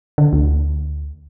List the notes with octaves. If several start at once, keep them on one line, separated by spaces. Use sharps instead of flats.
D3
D2